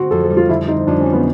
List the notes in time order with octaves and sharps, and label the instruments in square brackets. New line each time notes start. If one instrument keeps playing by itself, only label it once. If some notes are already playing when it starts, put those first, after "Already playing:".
Already playing: [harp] D3 C4 [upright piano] F#4
[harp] F2 [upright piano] A4
[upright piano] A4
[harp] G3
[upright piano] F4
[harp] D3 [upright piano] E4
[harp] C4 [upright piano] D#4
[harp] F2 [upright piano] D4
[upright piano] C#4
[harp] G3
[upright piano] B3